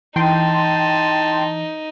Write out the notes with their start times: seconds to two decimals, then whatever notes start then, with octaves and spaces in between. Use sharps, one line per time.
0.16 E3 D#4 G5 A5 C6